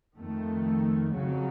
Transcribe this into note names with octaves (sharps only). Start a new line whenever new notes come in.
F2 D#3 A3
F2 C#3 F#3